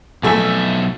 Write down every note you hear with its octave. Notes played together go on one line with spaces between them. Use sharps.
B1 F2 A3 E5 G#5